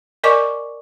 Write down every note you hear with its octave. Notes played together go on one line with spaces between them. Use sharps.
A#4 D5 D#5 G#5 C#6 D6